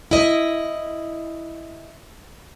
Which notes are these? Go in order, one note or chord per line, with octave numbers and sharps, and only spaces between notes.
E4 D#5